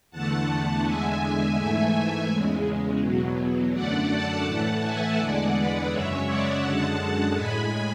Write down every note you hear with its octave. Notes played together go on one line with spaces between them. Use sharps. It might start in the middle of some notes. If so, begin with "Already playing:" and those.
E2 D3 A3 F#5 A5
F#5 A5
E2 D3 G#3 E5 G#5
G#2 E3 A3
E2 C#3 G#3
E2 B2 F#3
F#2 D3 A3 D5 F#5
F#5 A5
A2 E3 A3 F#5 A5
E5 G#5
E2 D3 G#3 D5 F#5
B4 D5
F#2 C#3 G#3 C#5 E5
D5 F#5
F#2 D3 G#3 F#5 A5
F#5 A5
A2 G#3 G#5 B5